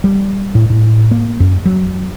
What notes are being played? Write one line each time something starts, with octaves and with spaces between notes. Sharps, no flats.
G3
A2
A2
A#3
F#2
F#3